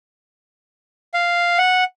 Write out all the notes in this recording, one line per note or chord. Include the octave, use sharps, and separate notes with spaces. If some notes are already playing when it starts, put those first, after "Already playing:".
F5
F#5